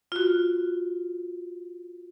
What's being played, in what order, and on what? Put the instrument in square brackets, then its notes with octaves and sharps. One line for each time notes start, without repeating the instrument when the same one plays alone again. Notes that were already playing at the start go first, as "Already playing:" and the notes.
[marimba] F4 F#4